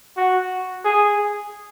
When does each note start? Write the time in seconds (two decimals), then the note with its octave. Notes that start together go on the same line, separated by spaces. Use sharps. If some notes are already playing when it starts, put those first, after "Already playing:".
0.17 F#4
0.85 G#4